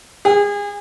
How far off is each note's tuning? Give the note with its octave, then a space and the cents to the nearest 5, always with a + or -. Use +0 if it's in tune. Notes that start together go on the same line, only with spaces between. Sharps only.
G#4 -30